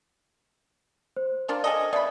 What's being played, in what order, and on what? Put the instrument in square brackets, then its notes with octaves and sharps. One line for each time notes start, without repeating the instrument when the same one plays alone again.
[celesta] C5
[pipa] A#3 D4 F4
G#4 A4 D#5
[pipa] B2 B5 [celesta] D5 E5 D#6